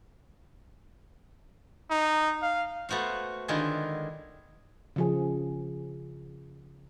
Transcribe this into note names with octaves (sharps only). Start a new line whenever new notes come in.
D#4
F5
A3 B3 F#4 C5 F5
D3 D#3 G#3 E4 F4 G#4
C#3 F3 G#4